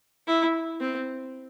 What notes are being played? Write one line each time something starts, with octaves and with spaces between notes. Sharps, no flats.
E4
C4